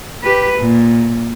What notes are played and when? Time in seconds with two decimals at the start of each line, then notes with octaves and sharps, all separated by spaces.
0.24 G4 B4
0.59 A#2